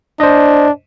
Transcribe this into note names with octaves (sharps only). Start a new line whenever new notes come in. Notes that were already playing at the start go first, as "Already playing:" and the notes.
D4 C5 D#5